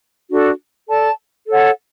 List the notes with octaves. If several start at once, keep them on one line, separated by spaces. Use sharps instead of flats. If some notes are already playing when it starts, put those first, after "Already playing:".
D4 F#4 A4
A4 D5 A5
A4 C#5 F#5